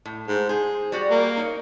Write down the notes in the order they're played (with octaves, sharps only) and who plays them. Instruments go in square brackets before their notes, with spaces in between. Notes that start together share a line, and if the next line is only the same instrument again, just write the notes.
[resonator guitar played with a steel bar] A2
[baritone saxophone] G#2
[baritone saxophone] G#4 [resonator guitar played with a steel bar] C5
[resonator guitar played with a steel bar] G3 F#4 D5
[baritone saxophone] A#3
[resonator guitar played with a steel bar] D#4 C#5